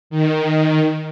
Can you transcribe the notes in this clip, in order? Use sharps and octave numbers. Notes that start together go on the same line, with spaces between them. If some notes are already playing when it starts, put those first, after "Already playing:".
D#3